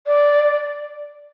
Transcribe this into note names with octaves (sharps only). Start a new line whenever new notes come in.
D5